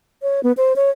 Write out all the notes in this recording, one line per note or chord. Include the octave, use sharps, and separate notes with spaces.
C#5
B3
C5
C#5